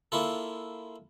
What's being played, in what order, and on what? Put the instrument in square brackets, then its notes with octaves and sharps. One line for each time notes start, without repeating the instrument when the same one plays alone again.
[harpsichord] A#3 E4 F4 A4